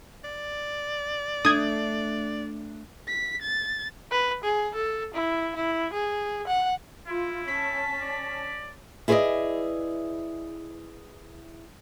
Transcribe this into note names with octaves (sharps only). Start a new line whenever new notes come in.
D5
A3 D4 D#6 G#6
B6
A6
B4
G#4
A4
E4
E4
G#4
F#5
E4 F4
C#4 A5 B6
D5
E4 G#4 B4 C5 D5 D#5